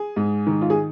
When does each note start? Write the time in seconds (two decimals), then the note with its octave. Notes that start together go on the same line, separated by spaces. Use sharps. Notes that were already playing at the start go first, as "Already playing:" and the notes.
Already playing: G#4
0.16 G#2
0.47 D#3
0.61 F4
0.70 G#4